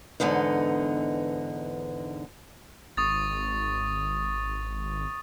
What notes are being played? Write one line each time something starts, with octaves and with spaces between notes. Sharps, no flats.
E2 G#2 D3 B3 D#4
G#1 C#6 D#6 A6